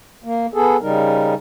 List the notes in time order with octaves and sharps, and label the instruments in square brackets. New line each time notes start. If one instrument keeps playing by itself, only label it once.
[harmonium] A#3
B3 G#4 A4
C#3 G3 D#4 A#4